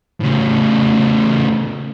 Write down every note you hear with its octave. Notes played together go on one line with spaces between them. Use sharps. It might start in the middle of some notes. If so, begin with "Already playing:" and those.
A2 C#3